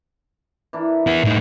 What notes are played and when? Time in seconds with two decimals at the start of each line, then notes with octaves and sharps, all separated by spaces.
0.73 E3 D4 A#4
1.07 B3 E4
1.24 A2 D#4